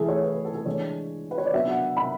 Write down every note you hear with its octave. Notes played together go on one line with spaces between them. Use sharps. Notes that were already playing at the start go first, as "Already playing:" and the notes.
Already playing: E3 A3 E4 G#4 A4
C#5
B4
B4
A4
A4
E3 G#3 D4 C#5
B4
C#5
D5
F#3 B3 D4 E5
F#5
B5